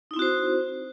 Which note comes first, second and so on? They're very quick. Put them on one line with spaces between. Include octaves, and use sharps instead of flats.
D#4 E4 C4 F#4 C5